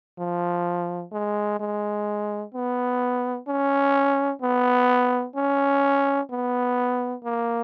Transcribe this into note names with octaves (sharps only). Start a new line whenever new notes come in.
F3
G#3
G#3
B3
C#4
B3
C#4
B3
A#3